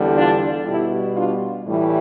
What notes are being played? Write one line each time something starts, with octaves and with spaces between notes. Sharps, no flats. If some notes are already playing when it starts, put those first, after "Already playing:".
Already playing: E2 D3 G3
D4 F4
B2 G3 E4 G4
D4 F4
A2 E3 G3